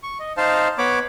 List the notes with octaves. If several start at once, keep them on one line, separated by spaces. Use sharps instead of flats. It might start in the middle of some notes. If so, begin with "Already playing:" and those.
C#6
D#5
D#4 C5 F5 A5
B3 C#5 B5 D6